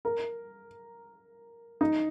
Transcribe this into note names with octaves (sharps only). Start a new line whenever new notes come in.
A#4
D#4